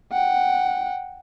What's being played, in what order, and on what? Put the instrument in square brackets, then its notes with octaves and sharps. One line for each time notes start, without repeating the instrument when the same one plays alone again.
[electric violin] F#5 G5